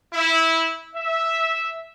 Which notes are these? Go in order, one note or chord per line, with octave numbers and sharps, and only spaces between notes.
E4
E5